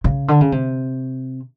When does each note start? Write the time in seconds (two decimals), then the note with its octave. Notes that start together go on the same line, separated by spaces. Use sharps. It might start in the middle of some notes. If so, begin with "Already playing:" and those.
0.04 C#3
0.28 D3
0.41 C#3
0.52 C3